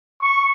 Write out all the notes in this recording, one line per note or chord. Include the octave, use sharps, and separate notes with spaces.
C#6